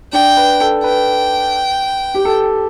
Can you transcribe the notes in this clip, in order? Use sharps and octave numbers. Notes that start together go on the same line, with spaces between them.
D4 G5
B4
A4
B4 G5
G4
A4